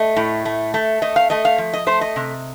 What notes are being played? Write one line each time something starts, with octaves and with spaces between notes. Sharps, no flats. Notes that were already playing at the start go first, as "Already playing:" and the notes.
Already playing: A3 D#5
A2
A3
A3
A3 D#5
F5
A3 D#5
F5
F3
D#5
A3 C5
D#5
C3